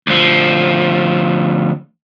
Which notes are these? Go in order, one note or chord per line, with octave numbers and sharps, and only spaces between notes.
D2 F3